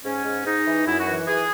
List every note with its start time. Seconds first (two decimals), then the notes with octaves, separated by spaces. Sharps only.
0.04 G#2 C#4
0.25 G#2
0.45 G#2 D#4
0.66 E3
0.86 F#2 E4
1.00 F#4
1.07 E3
1.27 E3 G#4